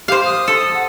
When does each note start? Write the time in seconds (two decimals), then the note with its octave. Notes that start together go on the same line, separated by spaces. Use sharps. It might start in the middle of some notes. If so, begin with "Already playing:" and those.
0.08 G4 C5 F5
0.25 D#6
0.48 A4
0.74 F#5